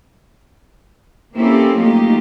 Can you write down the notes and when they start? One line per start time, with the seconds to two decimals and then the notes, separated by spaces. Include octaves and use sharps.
1.35 A#3 C4 C#4 E4 G4 A4
1.78 F#3 A3 A#3 D#4 F4 G4